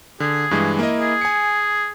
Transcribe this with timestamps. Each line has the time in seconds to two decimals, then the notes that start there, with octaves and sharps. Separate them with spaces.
0.20 D3 G#4
0.51 G2 E3 G#3
0.79 A#3 E4 D#5
0.99 G#4
1.21 G#5 C#7